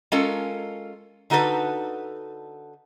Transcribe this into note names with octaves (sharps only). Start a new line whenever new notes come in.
G#3 C#4 F4 A4 A#4
D3 D#4 F#4 A4 B4